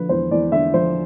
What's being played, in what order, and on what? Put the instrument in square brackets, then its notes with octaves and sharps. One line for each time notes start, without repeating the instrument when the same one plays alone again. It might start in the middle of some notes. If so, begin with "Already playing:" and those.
Already playing: [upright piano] D3 F3 B4
E2 C5
E2 D5
D3 E5
F3 C5